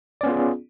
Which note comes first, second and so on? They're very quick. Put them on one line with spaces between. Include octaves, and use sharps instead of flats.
D5 C#4 B3 F4 G#4